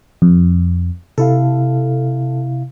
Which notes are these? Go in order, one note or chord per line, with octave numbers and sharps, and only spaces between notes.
F2
C3 E4 A4 F5